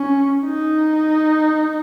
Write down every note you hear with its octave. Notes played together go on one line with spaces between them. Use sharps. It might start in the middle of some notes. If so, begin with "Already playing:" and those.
Already playing: C#4
D#4